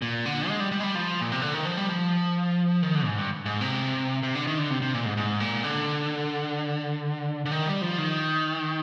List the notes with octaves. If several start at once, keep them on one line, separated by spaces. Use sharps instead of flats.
A#2
D3
G#3
G3
G3
G#3
G3
F3
A#2
C3
D3
D#3
F3
G3
F3
D#3
D3
G#2
G2
G#2
C3
C3
D3
D#3
D3
C3
C3
A#2
G#2
G#2
A#2
D3
D3
D#3
G3
F3
D#3